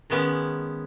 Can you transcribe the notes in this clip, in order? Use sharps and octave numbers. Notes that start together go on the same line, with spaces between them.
D#3 G#3 B3 C#4